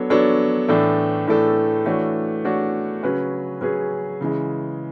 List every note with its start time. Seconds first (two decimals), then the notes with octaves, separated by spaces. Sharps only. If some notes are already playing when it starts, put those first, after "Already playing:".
Already playing: F#3 B3 D4 A4 C#5
0.10 F#3 B3 D4 A4 C#5
0.68 A2 E3 A3 D4 A4
1.27 A2 E3 A3 D4 A4
1.86 E3 A3 D4 F#4 C#5
2.44 E3 A3 D4 F#4 C#5
3.03 C#3 F#3 C#4 G#4 B4
3.61 C#3 F#3 C#4 G#4 B4
4.21 C#3 E3 G#3